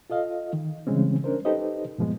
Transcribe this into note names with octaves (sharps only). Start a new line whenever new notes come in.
F4 A4 D#5 F5
D#3
C#3 E3 G3 G#3 C4 C#4
C#4 D4 A#4 C5
D#4 G4 A4 B4 C5 D#5
G2 A#2 F3 G#3 B3